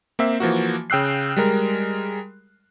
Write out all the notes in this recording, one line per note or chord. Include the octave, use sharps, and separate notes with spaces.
A#3 C4 E5
E3 F3 A#3 F#4
C#3 G5 E6 F#6 C7
G3 G#3 A#4